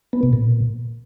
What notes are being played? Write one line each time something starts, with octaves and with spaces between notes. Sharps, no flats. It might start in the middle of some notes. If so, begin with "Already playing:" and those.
B3
B2
A#2